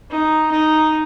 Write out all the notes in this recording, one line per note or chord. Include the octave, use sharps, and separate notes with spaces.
D#4
D#4